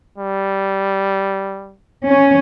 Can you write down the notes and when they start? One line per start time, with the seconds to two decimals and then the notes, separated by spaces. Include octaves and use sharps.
0.18 G3
2.07 C#4